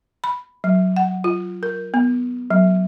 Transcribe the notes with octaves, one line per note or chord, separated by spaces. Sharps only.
B5
F#3
F#5
F4
A#4
B3
F#3